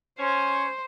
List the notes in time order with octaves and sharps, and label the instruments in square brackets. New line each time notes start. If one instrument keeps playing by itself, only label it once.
[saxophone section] C#4 [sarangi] C5